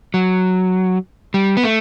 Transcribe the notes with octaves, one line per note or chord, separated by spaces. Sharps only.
F#3
G3
B3
A3